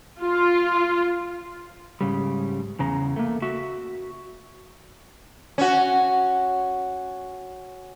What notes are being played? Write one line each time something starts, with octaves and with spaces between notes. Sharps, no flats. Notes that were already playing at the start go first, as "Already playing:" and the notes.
F4
G#2 C#3 G3
E2 C#3 A#5
A3 A#3
F#4 E5
C#4 F#4